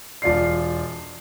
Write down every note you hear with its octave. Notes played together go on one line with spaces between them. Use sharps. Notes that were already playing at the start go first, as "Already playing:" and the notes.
E1 F4 D5 C7